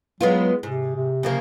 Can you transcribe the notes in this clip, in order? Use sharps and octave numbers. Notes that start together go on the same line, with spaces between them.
F#3 G#3 B3 F4
G#2 C3
C3
C#3 F3 A#3